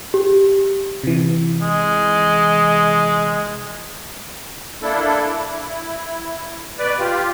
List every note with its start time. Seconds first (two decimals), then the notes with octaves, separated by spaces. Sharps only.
0.14 G4
1.04 C3 E3
1.61 G#3
4.82 A#3 D4 E4 A4
5.27 E4
6.78 B2 B4 D5
6.99 F4 G4